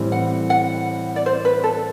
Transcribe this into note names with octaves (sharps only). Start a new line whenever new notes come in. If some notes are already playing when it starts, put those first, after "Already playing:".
Already playing: A2 E3 G3 C4
F#5
F#5
D5
C5
B4
A4